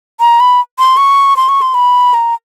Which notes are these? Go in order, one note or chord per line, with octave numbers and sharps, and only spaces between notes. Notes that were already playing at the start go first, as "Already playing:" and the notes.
A#5
B5
C6
C#6
C6
C#6
C6
B5
A#5